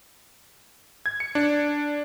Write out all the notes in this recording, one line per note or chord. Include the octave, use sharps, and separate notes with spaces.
G#6
C#7
D4